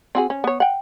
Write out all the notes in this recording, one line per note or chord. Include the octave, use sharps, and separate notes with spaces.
C4 F#4 G#4
C#4
B3 C#5
F#5 G5